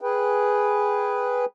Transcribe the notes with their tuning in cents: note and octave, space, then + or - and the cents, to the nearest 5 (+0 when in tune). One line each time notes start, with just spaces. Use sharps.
G#4 +0 B4 +0 G5 +0